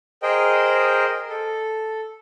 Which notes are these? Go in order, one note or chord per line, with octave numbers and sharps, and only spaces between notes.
G#4 A#4 C5 D#5 G5
A4